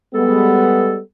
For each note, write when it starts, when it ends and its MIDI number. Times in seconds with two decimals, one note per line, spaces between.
0.14 1.00 55
0.14 1.00 56
0.14 1.00 59
0.14 1.00 69